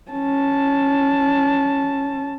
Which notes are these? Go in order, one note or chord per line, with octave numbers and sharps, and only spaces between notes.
C#4 A5